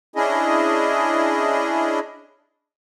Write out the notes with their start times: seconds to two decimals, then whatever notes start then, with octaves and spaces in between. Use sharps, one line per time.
0.16 C#4 D4 E4 G#4 D#5